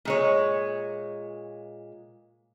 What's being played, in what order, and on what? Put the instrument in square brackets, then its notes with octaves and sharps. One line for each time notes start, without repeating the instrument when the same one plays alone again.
[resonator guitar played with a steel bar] A#2 G#3 C#5